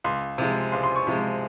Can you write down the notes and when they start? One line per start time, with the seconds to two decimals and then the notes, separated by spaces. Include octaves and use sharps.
0.04 C#2 C6
0.38 C3 F3 G#3
0.72 C#2 C6
0.84 C6
0.96 C#6
1.07 C3 F3 G#3